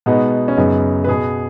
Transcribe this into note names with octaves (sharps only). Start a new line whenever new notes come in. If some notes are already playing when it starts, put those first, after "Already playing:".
B2 G#3 B3 D#4
C#4
F#2 C#3 B3 D#4
B4
B2 B3 G#4